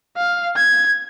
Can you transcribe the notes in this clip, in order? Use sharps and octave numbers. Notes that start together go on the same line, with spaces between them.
F5
G#6